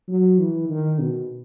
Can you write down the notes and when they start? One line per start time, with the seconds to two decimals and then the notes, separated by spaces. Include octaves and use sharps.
0.08 F#3
0.38 E3
0.69 D#3
0.99 B2